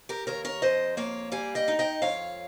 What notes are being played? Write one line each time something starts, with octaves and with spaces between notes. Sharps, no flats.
G4 A#4
D#2 A#4 C#5
A#4 C#5
F2 C5 D#5
A#3 C#5 F5
G3 F5 G#5
D#5 G5
D#4
D#5 G5
F2 C#5 F5